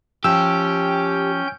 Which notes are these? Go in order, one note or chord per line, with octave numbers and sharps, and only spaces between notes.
F3 C#4 G4 G5 E6 G6